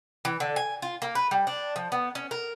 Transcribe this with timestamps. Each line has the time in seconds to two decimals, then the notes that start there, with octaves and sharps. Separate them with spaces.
0.25 E3
0.40 D3
0.56 G#5
0.82 F4
1.02 A#3
1.15 B4
1.31 G3
1.47 D4
1.76 F3
1.92 B3
2.15 C#4
2.31 A#4